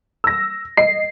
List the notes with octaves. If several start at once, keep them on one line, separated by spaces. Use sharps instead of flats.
E6 A#6
D#5 C7